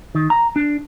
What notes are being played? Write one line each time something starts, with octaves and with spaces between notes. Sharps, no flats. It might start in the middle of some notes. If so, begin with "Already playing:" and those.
D#3
A#5
D4